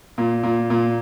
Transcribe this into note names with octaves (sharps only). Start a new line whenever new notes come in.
A#2
A#2
A#2